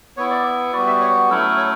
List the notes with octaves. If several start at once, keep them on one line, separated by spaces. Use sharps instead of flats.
B3 E4 C#5
D5
G3 B3 F#4 D5
E5
C#5
F#3 A3 C#4 E4 A4
C#5